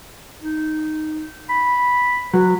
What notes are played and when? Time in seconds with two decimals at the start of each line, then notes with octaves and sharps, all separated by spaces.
0.42 D#4
1.49 B5
2.34 F#3 B4